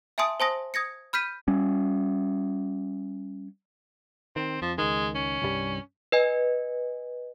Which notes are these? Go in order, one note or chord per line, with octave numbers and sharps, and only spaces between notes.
E5 G#5 A5 C6 D#6 D7
C5 G#5 A5 C6 D#6 A#6
D#6 G#6 A#6 C#7
B5 F6 G6 B6 D#7
G3 C#4
D#3 C4
F2 F3
C#2 D#3 G#3
C#4
C2 G2 G3
B4 D#5 G#5